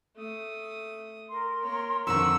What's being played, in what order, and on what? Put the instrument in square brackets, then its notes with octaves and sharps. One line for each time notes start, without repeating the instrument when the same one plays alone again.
[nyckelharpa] A3 D#6
[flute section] A#4 C6
[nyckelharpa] A#3 C#5
[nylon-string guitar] F2 D3 D#3 [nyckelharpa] C#6 [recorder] E6